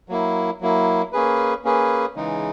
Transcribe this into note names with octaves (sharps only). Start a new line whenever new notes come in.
F#3 A#3 E4
F#3 A#3 E4
A#3 C#4 G#4 B4
A#3 C#4 G#4 B4
C#3 E3 G#3 D#4